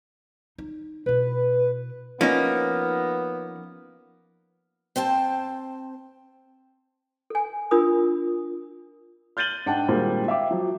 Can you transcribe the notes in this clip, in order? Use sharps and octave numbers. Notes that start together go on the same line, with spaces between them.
D#4
B2 E4 B4
F3 A#3 B3 C#4 D#4
C4 C5 G5 A5
A4 G#5
D4 F4 A#4 B5 D#6
F6 G6 A6 D#7 F#7 G7
G#2 D4 F#5 G5 A5
A#2 D#3 G3 G#3 A#3 C4
E5 F5 G5 D6
F3 F#3